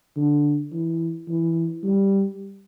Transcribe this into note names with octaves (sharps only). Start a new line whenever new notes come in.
D3
E3
E3
G3